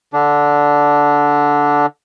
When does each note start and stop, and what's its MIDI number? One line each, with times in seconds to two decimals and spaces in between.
0.13 1.86 50
0.13 1.86 62